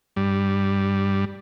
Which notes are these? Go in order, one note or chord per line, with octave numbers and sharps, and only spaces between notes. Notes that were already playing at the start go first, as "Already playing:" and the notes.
G2 G3